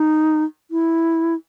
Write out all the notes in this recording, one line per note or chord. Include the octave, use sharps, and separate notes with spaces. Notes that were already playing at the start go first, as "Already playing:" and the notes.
Already playing: D#4
E4